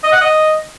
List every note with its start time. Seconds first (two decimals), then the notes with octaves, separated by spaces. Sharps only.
0.03 D#5
0.12 F#5
0.21 D#5